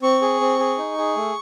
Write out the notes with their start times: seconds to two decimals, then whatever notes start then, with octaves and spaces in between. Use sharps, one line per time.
0.02 C4 C#6
0.22 G#4
0.41 C4
0.59 G#4
0.78 D#4
0.98 G#4
1.16 A3